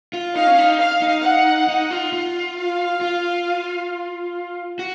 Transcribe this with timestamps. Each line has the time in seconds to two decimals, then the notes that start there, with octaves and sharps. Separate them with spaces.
0.13 F4
0.36 D#4 F5
0.47 C#4
0.58 D#4
0.80 F5
1.02 D#4
1.24 F#5
1.69 D#4
1.91 F4
2.13 F4
2.58 F5
3.01 F4
4.79 F#4